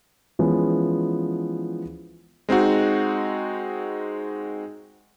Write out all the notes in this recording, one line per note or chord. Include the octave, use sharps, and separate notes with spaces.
E3 F3 G#3 B3 C#4
G#3 C4 D#4 F#4